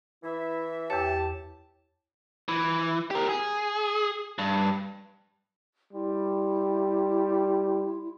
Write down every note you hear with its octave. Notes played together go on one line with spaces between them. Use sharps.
E3 E4 E5
E2 G4 C#5 A5
E3
G4 A#4
G#4
G2
G3 E4 C6